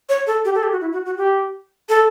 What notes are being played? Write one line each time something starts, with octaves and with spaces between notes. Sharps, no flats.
C#5
A4
G4
A4
G4
F#4
E4
F#4
F#4
G4
A4